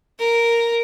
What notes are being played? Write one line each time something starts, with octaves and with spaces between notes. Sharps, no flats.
A#4